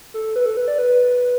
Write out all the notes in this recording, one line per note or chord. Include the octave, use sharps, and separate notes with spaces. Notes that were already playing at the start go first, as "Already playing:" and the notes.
A4
B4
A4
B4
D5
B4